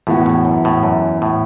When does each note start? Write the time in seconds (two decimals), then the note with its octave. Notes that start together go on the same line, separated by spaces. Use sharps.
0.07 E2 A2 E3 B3 F#4
0.26 A2
0.45 F#2
0.65 A2
0.83 F#2
1.22 A2